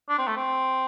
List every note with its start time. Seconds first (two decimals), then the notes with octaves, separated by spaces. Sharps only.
0.09 D4
0.18 C4
0.27 A3
0.37 C4